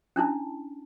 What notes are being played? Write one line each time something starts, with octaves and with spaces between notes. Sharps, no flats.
C#4 D4 E4 A5